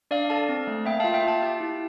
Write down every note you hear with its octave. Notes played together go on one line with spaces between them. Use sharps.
D4 D5 F5
A4 F5 A5
C4
A3
A#3 E5 G5
F4 F5 A5
E5 G5
F4
F5 A5
G4 F5 A5
E4